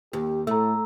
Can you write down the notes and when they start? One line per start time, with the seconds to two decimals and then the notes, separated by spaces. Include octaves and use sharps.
0.13 D#2 G4
0.47 A2 A3 A#5 E6